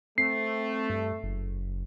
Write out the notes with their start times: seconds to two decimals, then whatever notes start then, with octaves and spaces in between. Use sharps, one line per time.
0.18 A3 C4 C7
0.90 G2
1.24 F#1